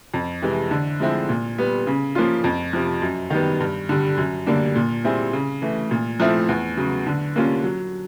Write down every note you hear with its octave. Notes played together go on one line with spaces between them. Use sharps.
F2
C3 E3 G#3
D3
F3 G#3 C4 E4
A#2
G3 B3
C#3
F3 A#3 C#4 F4
F2
C3 F3
F#2
D#3 G3 B3
G2
D3 G3
F#2
D3 G3 A#3 D4
A#2
G3 C4 E4 G#4
C#3
E3 A3
A#2
F3 A3 C4 E4
E2
C#3 F#3
D3
G3 A#3 C#4 F4
F#3